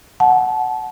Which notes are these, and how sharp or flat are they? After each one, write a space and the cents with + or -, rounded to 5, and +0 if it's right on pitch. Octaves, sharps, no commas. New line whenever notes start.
F#5 +0 A5 -25